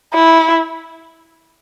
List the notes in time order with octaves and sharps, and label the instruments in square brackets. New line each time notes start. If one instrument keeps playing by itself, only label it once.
[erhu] E4